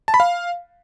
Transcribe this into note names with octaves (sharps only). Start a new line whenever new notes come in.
A5
B5
F5